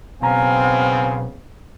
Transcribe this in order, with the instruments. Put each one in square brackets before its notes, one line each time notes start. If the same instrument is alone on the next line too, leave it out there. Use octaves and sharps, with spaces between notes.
[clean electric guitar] B1 A#5 [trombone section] C#3 B3 C4 [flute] F5 [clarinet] G#5